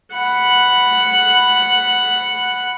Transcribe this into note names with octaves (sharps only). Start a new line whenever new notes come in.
F#5 B5